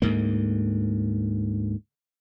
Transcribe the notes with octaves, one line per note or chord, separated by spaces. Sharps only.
D2 G#2 A#3